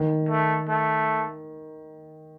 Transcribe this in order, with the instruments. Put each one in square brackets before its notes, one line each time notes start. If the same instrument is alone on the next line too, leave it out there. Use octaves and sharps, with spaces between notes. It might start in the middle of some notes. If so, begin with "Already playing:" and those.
Already playing: [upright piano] D#3
[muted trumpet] A3
A3